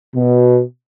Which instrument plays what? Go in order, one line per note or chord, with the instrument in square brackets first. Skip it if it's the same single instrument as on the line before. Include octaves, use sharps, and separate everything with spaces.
[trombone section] B2